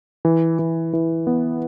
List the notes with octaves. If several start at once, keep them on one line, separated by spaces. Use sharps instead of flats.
E3
E3
E3
B3